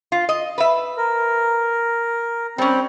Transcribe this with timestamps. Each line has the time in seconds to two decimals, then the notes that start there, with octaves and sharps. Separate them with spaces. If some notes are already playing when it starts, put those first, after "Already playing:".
0.12 F4
0.29 D#5
0.58 B4 E5
0.97 A#4
2.58 G3 C4 C#4